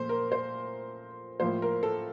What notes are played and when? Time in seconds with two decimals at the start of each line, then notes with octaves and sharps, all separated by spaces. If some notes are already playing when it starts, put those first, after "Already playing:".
Already playing: A#2 F3 A3 C5
0.09 A#4
0.32 C5
1.40 A2 F3 A#3 C5
1.62 A#4
1.83 A4